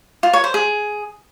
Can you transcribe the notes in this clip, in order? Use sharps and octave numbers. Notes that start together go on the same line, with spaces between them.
F4
C#5
C5
G#4